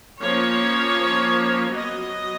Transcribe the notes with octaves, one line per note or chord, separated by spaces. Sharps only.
F3 A#3 C#4 C#5
F#3 B3 D#5